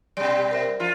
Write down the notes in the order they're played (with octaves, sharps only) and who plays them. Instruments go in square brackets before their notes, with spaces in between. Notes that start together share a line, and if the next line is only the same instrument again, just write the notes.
[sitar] B2 G3 [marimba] D5
[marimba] A#4 C5 E5
[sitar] F3 F4